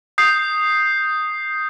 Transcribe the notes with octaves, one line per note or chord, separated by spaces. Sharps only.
D#6 G6 C7